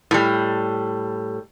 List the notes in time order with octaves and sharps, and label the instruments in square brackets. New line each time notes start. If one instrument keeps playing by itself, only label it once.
[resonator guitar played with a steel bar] A2 G3